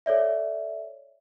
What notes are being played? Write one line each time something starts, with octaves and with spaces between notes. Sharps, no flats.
A4 C#5 D5 E5